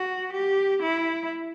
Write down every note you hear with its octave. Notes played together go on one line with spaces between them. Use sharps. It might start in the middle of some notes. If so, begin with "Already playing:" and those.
Already playing: F#4
G4
E4